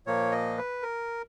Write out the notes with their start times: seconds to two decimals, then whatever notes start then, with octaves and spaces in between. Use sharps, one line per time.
0.07 A#2 F3 A#3 C#5
0.32 D#5
0.58 B4
0.82 A#4